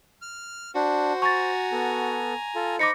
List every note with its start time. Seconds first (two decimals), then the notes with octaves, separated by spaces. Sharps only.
0.22 F6
0.75 D4 F#4 C5
1.22 G#5 A#5 C#6 A6
1.72 B3 A4
2.55 F4 A4
2.79 D#4 C5 B5 D6 A#6 C#7